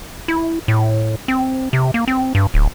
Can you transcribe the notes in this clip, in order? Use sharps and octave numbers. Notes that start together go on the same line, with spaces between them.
E4
A2
C4
C3
A#3
C4
G2
D1